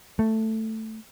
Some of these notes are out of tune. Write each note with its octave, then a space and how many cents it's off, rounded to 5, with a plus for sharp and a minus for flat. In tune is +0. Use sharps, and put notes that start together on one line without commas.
A3 +5